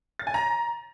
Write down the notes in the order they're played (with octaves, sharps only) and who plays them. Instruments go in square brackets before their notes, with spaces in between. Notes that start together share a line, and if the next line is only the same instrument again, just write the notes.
[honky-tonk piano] A6
G#5
A#5